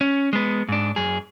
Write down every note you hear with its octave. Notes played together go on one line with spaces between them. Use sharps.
C#4
G#3 B3
G#2 D4
F#2 G#4